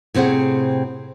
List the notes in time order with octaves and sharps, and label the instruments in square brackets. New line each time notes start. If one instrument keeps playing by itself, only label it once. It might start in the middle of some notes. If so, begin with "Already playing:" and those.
[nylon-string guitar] A2 C3 C4 G#4 F#5